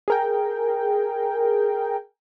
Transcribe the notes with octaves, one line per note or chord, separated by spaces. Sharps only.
G#4 A#4 G5